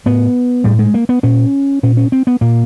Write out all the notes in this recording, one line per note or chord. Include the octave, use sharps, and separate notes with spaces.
A2 B3
A2 G3
G#3
A#3
B3
A#2 C#4
A#2 C#4
C#4
C4
B3
A#2 A#3